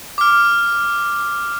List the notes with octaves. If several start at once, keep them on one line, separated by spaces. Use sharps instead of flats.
D6 F6